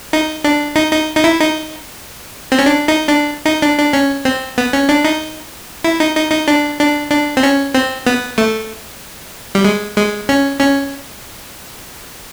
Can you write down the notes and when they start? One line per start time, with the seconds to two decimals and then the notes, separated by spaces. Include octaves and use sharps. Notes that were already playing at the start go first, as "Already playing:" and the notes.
0.13 D#4
0.44 D4
0.76 D#4
0.92 D#4
1.16 D#4
1.24 E4
1.40 D#4
2.52 C4
2.59 C#4
2.66 D4
2.88 D#4
3.08 D4
3.46 D#4
3.62 D4
3.78 D4
3.93 C#4
4.25 C4
4.58 B3
4.73 C#4
4.89 D4
5.05 D#4
5.84 E4
6.00 D#4
6.16 D#4
6.31 D#4
6.48 D4
6.80 D4
7.11 D4
7.37 C4
7.43 C#4
7.74 C4
8.06 B3
8.38 A3
9.55 G3
9.65 G#3
9.97 G#3
10.29 C#4
10.60 C#4